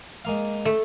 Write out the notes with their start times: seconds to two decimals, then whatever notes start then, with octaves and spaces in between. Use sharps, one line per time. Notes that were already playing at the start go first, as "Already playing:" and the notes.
0.25 G#3 A#3 F5
0.65 A3